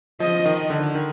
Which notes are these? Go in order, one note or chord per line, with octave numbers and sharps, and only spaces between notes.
F3 D#5
D#3
D3
D#3